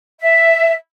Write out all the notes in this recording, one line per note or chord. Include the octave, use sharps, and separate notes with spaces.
E5